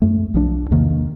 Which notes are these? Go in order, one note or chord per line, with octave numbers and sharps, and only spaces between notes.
F#2 A3
B1 F3 D4
E2 C3 D#3 A#3